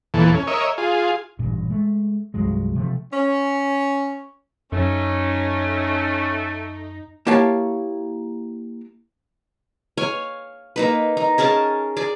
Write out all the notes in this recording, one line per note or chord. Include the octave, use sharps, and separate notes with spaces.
E2 A#2 E3 A4
C#4
A#4 C#5 D#5 E5
F4 G#4
A1 G2 A#2
G#3 A3
C2 G2 F#3 G#3
C3 F3 A3
C#4
F#2 A3 C#4 D#4
A#3 E4 G4 C#5 F5 A5
C#5 F5 G#5
A#3 D#4 B4
D#4
C#4 G#4 A#4 A5
G#4 D5